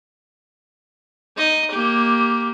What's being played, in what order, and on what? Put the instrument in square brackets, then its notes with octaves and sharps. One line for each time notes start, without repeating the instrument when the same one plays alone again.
[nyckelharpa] D#4 D#5
A#3 G4